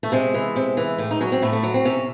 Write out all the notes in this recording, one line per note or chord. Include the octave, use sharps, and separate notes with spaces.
A3
C3 G#3
E3
C3
E3
A2
D#4
F#3 C#4
C4
A2 A3
A3
F#3
C4
C3 C#4